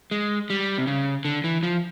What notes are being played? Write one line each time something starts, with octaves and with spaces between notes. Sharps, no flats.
G#3
G3
C3
C#3
D3
E3
F3